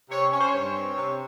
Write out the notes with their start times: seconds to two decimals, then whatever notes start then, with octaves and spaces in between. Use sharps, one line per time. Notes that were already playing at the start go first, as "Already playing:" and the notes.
0.10 C3 C#5
0.32 C#4 C#5
0.40 C5
0.49 C#5
0.54 G2
0.75 C4
0.97 C3